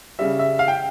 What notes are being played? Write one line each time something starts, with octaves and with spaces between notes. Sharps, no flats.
C#3 G3 E5
E5
F5
G5